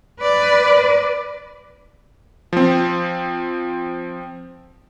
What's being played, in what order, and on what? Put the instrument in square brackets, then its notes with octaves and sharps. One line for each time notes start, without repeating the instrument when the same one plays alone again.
[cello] B4 D5
[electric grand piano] F3 C4